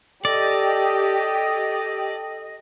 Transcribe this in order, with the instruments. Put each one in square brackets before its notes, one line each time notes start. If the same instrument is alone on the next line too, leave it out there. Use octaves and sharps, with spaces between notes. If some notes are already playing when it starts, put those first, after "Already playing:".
[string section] G4 [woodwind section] A4 D#5 [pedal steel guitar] D5